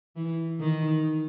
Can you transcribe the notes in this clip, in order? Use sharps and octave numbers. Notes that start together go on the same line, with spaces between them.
E3
D#3